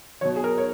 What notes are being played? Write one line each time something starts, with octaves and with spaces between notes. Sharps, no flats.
B2 F#3 C#5
G#4
A#4
C#5